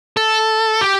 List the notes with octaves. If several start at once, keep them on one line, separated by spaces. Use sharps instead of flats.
A4
G4